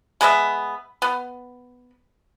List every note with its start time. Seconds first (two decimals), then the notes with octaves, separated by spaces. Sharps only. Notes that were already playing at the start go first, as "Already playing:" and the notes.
0.21 G#3 B3 D5 E5
1.02 B3